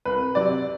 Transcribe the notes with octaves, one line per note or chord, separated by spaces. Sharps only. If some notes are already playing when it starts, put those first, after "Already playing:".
C2 B4
C3 F#3 D5